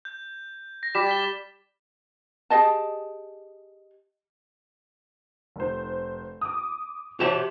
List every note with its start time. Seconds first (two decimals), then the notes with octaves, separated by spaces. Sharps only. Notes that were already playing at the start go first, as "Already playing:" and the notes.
0.05 G6
0.83 A#6
0.95 G3 D6 B6 E7
1.07 A6 B6 G7
2.50 G4 G#4 D#5 A5
5.56 F1 C5
6.41 D6 D#6
7.20 F#4 G4 C5 C#5 E5 A5